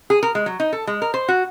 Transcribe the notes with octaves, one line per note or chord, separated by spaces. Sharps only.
G#4
A#4
G#3
F#3
D#4
A4
G#3
A#4
C5
F#4